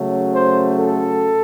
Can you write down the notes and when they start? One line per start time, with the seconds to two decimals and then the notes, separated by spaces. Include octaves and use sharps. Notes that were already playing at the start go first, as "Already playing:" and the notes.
Already playing: C#3 F#3 A3
0.34 C5
0.78 A4